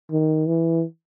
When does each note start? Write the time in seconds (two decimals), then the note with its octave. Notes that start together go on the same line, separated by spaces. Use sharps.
0.11 D#3
0.47 E3